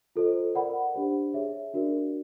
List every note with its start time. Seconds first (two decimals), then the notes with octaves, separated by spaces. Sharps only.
0.16 F4 A4 C5 D#5
0.55 A#4 D5 F#5 B5
0.94 D4 G4 C5
1.34 G#4 C#5 E5
1.74 D4 F#4 A#4 D5